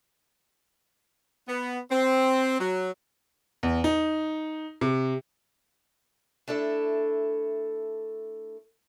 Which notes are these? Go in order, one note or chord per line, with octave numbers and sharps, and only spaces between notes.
B3
C4
F#3
E2
D#4
C3
A3 D4 E4 A4